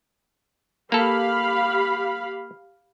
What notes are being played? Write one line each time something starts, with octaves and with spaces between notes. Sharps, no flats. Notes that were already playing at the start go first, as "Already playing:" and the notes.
A#3 G4 A4 F5 B5